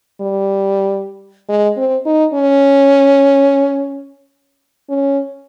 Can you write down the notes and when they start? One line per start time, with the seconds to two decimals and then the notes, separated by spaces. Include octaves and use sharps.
0.21 G3
1.49 G#3
1.77 C4
2.06 D#4
2.34 C#4
4.89 C#4